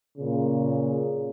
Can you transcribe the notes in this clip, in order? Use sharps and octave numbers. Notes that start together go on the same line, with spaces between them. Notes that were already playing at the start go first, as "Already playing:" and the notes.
A#2 C#3